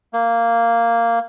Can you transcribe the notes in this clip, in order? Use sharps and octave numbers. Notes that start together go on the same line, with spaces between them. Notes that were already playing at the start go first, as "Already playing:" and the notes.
A#3